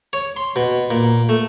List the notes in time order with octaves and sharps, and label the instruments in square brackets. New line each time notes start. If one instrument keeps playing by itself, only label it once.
[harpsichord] C#5
C6
B2
A#2
A3